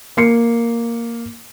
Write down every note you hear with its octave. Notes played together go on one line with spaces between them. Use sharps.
A#3 C7 C#7